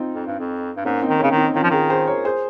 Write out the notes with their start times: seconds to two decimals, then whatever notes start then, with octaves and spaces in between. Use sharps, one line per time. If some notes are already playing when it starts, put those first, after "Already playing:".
Already playing: C4 D#4 F4
0.14 F2
0.26 G2
0.39 F2
0.77 G2
0.85 G#2 A#3 C#4
1.02 C4 D#4
1.09 D#3
1.19 C#3 A#3 C#4
1.31 D#3
1.37 C4 D#4
1.54 D#3 C#4 F4
1.63 F3
1.71 D#3 F4 G#4
1.89 G#4 C5
2.07 A#4 C#5
2.25 G#4 C5